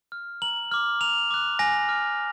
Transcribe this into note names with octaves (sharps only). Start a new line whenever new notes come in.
F6
A#5 F#7
D6 F6
A#5 F7
D6 F#6
G#5 A#6
D6 F6